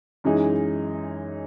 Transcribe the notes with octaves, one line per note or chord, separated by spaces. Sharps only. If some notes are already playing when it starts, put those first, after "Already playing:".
F#2 E3 G#3 D#4 G#4